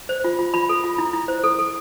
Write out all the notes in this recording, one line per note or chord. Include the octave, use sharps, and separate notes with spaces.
C5
F4
F4
F4 B5
A4
F4
E4
E4
C5
A4
A4